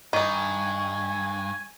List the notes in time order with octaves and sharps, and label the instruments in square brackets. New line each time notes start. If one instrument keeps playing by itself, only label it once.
[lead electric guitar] G2 [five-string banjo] D#3 D#4 [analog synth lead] G#5 [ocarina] C#6